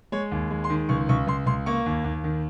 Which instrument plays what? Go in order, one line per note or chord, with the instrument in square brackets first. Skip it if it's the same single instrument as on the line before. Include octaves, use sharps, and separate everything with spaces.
[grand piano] G#3 C#5
D#2
G#3
C6
D#3
C#2 C#6
C#2 C#6
C#2 C6
C#2 C6
A#3 C#6
D#2
D#2
D#3